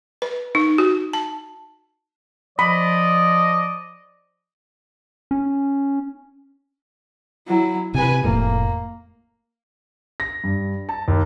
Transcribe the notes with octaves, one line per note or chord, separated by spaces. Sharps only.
B4
D#4
F#4
A5
F3 D5 D#5 B5
C#4
F#3 E4
C3 B4 G#5
F1 F2 A2 A#3
A#6
G2
A5
D#2